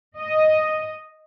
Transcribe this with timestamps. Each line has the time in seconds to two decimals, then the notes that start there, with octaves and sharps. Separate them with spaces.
0.19 D#5